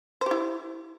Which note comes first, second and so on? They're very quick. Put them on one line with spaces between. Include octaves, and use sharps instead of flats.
C5 G4 E4